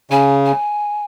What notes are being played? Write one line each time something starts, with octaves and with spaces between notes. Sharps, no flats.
C#3 G#5
G#5